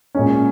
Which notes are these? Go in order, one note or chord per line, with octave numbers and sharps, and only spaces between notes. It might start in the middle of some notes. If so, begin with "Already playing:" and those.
A#2 G#3 C#4